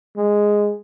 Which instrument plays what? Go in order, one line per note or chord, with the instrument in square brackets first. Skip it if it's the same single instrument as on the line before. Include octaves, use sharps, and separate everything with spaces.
[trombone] G#3